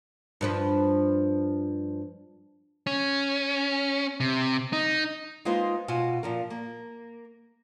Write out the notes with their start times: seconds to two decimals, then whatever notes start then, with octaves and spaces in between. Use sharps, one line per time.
0.41 G2 F3 B4
2.87 C#4
4.20 C3
4.73 D#4
5.45 G#3 A#3 D#4 F4 B4 C5
5.88 B2 F4 F#4 G#5
6.23 A#2 F3 A#4
6.50 A#3